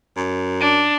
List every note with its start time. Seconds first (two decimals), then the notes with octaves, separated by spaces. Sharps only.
0.17 F#2
0.60 D4